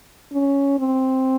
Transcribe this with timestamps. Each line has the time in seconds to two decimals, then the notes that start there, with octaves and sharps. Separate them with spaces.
0.33 C#4
0.79 C4